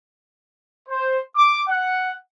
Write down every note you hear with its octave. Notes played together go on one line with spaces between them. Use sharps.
C5
D6
F#5